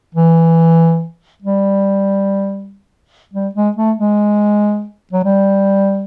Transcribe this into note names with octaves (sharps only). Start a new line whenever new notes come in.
E3
G3
G3
G#3
A3
G#3
F#3
G3